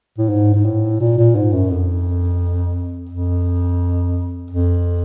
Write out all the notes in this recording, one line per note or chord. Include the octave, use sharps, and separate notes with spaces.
A2
G#2
G#2
A2
A#2
A#2
G#2
F#2
F2
F2
F2